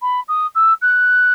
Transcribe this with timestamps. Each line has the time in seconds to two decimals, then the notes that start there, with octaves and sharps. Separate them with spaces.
0.02 B5
0.28 D#6
0.55 E6
0.82 F#6